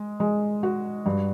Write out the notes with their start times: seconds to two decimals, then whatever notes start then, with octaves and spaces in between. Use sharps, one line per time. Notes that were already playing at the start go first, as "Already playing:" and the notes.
Already playing: G#3
0.20 G#3
0.63 F#4
1.06 G2